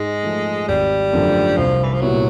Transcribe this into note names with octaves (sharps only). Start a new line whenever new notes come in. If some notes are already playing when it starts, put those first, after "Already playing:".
Already playing: G#2 G#3
F3 A3
G#1 G3
F#2 D3 F3 A3
C2 F3
E3
F3
A#2 F#3 G3 B3 E4